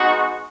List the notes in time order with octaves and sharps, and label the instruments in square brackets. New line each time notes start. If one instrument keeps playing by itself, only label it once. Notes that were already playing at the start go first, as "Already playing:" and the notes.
Already playing: [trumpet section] G#3 B3 D#4 F#4